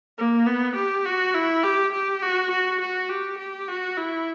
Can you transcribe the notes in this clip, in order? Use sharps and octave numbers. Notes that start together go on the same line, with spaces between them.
A#3
B3
G4
F#4
E4
G4
G4
F#4
F#4
F#4
G4
G4
F#4
E4